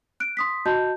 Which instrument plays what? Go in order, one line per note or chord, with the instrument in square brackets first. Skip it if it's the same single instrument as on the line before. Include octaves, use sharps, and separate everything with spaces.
[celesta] F#6 D7
C6 D#6 B6
F#4 D#5 A5 G6